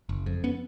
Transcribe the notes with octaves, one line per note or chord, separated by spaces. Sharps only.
F#1
F2
B3 C#4